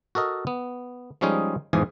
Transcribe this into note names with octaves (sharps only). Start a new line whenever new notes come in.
F#4 A4 A#4 D#5
B3
F3 G3 G#3 C#4 D#4 G#4
E2 G#2 E3 F3 G#4 G#5